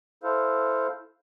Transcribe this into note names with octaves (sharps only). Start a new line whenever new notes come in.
E4 A4 C5 F5